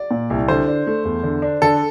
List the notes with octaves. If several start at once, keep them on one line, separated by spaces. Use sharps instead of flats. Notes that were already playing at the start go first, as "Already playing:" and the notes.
Already playing: D5
A#2
C2
D3 C5
D4
A3
E2
D3
D4
D3 A4